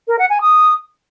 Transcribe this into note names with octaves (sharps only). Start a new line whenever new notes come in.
A#4
F#5
G#5
D#6